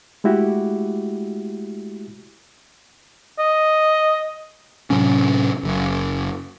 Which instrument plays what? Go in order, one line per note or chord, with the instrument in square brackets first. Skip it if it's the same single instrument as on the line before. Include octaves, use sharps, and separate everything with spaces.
[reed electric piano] G#3 A3 E4 F#4 G4
[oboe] D#5
[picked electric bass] A2 C3 F#3 C#4
F#1 F#2